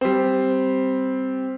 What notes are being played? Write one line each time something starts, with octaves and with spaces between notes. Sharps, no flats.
G3 C4